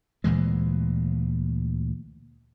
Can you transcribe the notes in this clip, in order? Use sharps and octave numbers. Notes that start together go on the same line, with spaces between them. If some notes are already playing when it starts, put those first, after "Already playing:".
D2 A#2 E3 G#3